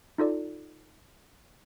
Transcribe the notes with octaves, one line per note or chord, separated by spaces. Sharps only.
D#4 F4 A4 D5